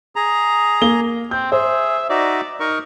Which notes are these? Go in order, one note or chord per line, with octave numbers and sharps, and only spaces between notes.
G#4 A#5
A#3 G7
C4 G6
G#4 C5 E5
D#4 F#4 D5 E5
D#4 A#4 C#6